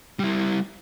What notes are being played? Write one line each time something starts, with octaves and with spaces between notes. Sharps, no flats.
G3 E4